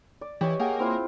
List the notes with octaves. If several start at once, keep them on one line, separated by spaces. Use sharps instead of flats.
D5
E3 G4 C#5 D#5
A#3 G#4 F#5 G5
C4 E4 F4